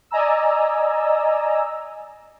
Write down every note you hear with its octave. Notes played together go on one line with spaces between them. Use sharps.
D5 D#5 G#5 A#5 E6